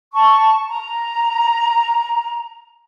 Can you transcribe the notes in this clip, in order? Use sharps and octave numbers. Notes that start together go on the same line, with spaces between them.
A5 C#6
A#5